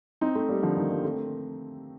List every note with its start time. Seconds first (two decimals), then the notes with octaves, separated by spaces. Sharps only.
0.21 C4 D#4
0.35 A3 C4
0.49 G3 A#3
0.63 D3 F3
0.77 D#3 G3
0.91 G3 A#3
1.04 A3 C4